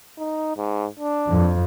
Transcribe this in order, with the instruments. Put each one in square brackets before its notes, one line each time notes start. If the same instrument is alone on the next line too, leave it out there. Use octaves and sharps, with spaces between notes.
[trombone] D#4
G#2
D4
[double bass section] F2